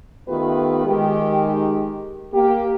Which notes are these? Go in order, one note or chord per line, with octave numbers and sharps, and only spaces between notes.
D#3 A3 B3 F4 G4 B4
D#3 G#3 G4
A#3 G4